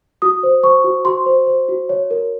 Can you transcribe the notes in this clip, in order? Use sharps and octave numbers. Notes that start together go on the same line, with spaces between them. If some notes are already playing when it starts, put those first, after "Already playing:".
F#4 D#6
C5
C5 C#6
F#4
F#4 C6
C5
C5
F#4
C#5
A#4